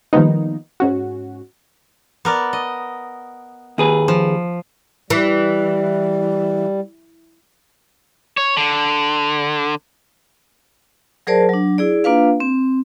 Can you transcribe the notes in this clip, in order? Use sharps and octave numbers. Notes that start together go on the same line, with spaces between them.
D#3 F3 G3 A#3 B3 D#4
G#2 C#4 F#4
B3 A#4 D5
D#5
D#2 G#4 B4
F3
E3 G3
C#5
D3
F#3 G#4 A#4 C5 D5 A5
F#3 D4
E4 G#4 D5
A#3 D4 F4 B4 F5
C4